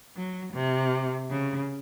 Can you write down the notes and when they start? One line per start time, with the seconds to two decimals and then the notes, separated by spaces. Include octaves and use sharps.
0.16 F#3
0.53 C3
1.30 C#3